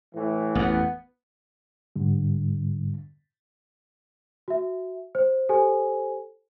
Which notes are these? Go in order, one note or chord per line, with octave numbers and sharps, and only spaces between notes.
A2 E3
A1 F2 B3
G#2 D3 G3
F#4 E5
C5
G4 A4 C5 G#5